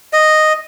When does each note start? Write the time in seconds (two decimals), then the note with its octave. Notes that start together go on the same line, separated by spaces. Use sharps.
0.13 D#5